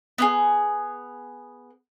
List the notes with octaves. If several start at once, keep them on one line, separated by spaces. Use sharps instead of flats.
B3 E4 G#4